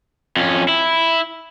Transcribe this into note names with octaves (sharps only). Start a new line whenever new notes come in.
F2 C#4
E4